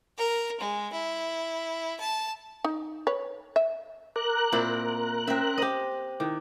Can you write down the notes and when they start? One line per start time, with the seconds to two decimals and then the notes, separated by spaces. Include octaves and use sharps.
0.17 A#4
0.60 G#3
0.92 E4
2.00 A5
2.64 D#4
3.07 B4 C#5
3.56 E5
4.16 A#4 D6 F#6
4.52 A#2 C4 E4 C5
5.27 C4 C#4 E5 A#6
5.58 G4 C5 D#5
6.20 D#3 E4 D6